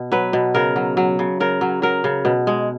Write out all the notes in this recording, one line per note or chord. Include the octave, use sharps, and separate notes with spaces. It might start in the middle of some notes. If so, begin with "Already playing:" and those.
Already playing: B2
F#3 B4
B2
C#3 A#4
F#3
F#3
C#3
C#3 A#4
F#3
F#3 A#4
C#3
B2
G#3